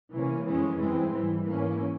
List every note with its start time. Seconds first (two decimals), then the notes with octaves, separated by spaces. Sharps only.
0.12 C3 E3 A#3 C#4
0.46 F2 E3 G#3 C#4
0.78 G2 E3 G#3 C4
1.12 G#2 E3 G3
1.45 G#2 E3 A#3 C#4